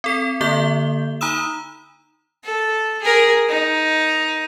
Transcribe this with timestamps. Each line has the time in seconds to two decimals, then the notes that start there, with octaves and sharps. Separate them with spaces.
0.04 C4 A4 B6
0.41 D3 A#3 A4 E5 G6 G7
1.21 D#4 A#5 B5 D#6 E6 E7
2.44 A4
3.02 G#4 A#4
3.49 D#4